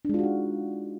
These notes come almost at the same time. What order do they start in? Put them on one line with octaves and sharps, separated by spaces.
D4 G#3 F4 F#4 D#4